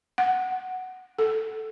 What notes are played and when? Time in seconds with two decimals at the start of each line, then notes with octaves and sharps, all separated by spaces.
0.18 F#5
1.19 A4